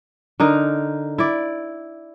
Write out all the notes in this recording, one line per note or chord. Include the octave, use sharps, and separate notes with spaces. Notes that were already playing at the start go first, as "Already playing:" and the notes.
D3 D#4 A#4
E4 D5